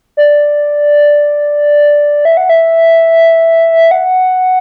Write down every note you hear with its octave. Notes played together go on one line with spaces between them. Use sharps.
D5
E5
F#5
E5
F#5